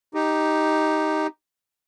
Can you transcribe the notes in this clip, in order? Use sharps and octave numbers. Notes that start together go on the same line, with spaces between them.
D#4 G4